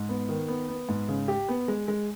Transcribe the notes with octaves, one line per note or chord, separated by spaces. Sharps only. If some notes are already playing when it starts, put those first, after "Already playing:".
Already playing: G#2
B3
D#3
B3
B3
G#2
C#3
G4
B3
G#3
G#3